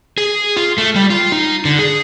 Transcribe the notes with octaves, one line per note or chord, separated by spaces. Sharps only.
G#4
F4
A3
G3
F4
D#4
D3
G#4